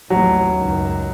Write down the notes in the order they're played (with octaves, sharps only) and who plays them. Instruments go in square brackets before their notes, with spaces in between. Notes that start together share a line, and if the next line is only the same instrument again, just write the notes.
[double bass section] A1 D#2 A2 [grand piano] F#3
[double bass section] C#2 F#2 D#3